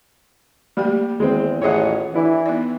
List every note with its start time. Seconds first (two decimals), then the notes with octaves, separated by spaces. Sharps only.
0.77 G3 A3 A#3 G5
1.20 E2 D#3 G#3 C4
1.62 A1 F4 G#4 C#5 D#5 E5 F#5
2.14 E3 D4 E4
2.46 B3 D#4 D5